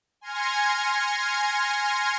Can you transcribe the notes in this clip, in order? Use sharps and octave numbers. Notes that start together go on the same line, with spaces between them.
G#5 C6 F6 G#6 A#6 C#7